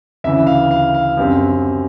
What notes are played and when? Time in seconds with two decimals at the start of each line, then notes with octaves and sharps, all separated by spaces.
0.24 D2 C#3 E3 E5
0.47 F5
0.71 F5
0.94 F5
1.17 F#2 D3 G3 C4